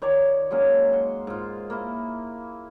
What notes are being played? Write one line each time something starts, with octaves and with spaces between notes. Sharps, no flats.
D#3 C#5 D5 A#5
F#3 G#3 A#3 C#4
F#5 C6
G#2 F4
A#3 E4